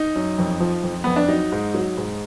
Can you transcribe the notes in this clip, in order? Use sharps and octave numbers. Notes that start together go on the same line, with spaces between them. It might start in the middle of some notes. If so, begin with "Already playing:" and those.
Already playing: D#4
F#2
F2
F3
F2
F2 B3
D4
F#3 D#4
G#2
F#3
G#2